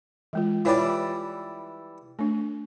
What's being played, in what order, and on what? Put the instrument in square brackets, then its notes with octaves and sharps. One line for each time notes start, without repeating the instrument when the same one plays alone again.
[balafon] E3 G#3 F4
[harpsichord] E3 G3 D5 [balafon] F4 C#5
[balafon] A3 D4